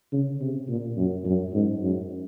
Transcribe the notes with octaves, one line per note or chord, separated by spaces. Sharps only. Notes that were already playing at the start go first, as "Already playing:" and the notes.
C#3
C3
A#2
F#2
F#2
G#2
F#2